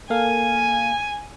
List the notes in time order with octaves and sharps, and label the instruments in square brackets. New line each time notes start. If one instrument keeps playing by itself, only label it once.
[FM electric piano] A#3 A4 F5 [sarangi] G#5